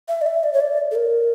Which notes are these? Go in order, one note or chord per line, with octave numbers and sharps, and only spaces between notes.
E5
D5
E5
D5
C#5
D5
A4
A#4